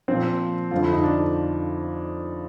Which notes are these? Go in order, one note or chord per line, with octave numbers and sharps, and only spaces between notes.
A#2 F3 C4
F2 D3 F3 F4
E4
D#4
D4